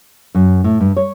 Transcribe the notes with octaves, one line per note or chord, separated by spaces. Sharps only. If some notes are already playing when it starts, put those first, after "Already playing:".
F#2
A2
G2
C#5